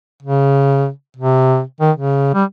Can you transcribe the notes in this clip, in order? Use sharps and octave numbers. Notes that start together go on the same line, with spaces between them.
C#3
C3
D#3
C#3
G3